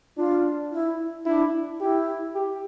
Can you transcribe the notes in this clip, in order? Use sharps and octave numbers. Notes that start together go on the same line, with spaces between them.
D4 F4
E4
D4 E4
E4 G4
G4